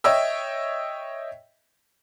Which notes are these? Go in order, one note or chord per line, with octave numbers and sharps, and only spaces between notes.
C#5 D#5 E5 G5 E6